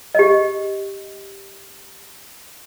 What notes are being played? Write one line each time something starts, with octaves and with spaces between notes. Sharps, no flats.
G4 D#5